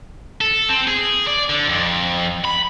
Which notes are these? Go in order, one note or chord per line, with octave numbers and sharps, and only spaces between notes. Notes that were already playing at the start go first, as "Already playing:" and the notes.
A4
C4
G#4
D5
D3
F2
B5